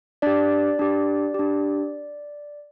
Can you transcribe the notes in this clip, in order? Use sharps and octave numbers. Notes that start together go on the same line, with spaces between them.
D4 G4 D5
D4 G4
D4 G4